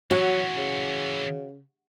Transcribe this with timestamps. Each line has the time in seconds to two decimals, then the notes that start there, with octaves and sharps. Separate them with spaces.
0.11 E3 F#3 C#4 F#4
0.57 C#3